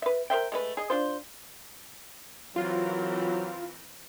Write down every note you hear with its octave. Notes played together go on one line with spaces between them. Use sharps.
B4 E5
A#4 C5 E5 G5
G#3 A3 B4
G#4 D#5
D4 F4 C5
E3 F#3 C4 F4 A#4